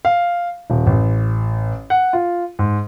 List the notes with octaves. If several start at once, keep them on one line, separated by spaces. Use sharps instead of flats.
F5
D#1
A1
F#5
F4
G#2